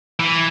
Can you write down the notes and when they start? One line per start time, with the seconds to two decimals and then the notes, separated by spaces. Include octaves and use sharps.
0.19 E3